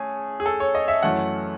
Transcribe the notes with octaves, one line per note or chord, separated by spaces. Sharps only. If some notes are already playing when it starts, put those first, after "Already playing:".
Already playing: A3 C#4 G#4
G#4
A4
C#5
D#5
E5
F#2 E3 A3 C#4 F#5